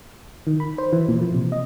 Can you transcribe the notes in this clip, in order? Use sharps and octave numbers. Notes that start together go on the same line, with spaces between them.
D#3
B5
C5
E3
A#2
F3
C3
D#5